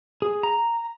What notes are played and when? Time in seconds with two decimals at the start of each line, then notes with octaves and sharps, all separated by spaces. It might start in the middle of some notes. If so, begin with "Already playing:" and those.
0.22 G#4
0.43 A#5